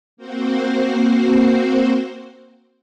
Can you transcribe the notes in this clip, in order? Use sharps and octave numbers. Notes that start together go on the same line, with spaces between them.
A#3 C4 F#4 C5